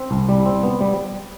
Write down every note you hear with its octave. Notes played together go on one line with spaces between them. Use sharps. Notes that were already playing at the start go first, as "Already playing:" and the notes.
Already playing: C4
C2
G3
C4
B3
G3